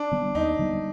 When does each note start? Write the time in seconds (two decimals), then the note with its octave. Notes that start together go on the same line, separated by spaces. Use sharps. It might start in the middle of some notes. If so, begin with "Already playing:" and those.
Already playing: D4
0.12 D3 G3 B3
0.35 D#2 D#4
0.59 D3 G3 B3